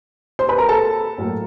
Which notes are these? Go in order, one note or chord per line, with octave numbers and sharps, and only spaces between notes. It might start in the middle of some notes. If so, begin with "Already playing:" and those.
C5 C6
B4 B5
A#4 A#5
A4 A5
A2 F#3 A#3